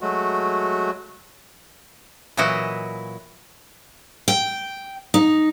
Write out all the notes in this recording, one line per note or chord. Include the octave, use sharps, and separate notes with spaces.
F#3 G#3 A3 F#4
A#2 E3 F#3 E4 F#4 D#5
G5
D#4